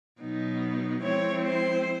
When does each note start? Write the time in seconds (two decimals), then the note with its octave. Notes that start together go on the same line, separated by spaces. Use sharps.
0.21 B2 F#3 B3 D#4
1.03 F3 G#3 C4 E4 C#5
1.44 C5